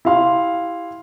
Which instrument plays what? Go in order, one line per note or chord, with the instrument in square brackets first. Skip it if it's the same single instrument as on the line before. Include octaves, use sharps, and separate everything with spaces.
[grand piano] E4 G4 F5 C6